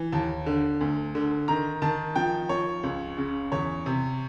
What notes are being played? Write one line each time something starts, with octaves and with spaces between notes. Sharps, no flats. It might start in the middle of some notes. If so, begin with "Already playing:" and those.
Already playing: E3
D#2 A5
D3
D2
D3
D#3 A#5
D#3 A5
F3 G5
F3 C#5
C#2
C#3
E2 C#5
C3